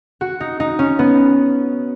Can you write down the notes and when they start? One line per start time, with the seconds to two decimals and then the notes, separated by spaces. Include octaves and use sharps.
0.21 F#4
0.40 D#4
0.60 D#4
0.79 C#4
0.99 B3